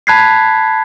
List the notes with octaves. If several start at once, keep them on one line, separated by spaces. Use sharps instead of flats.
A5 B5 F#6 G#6 B6 C7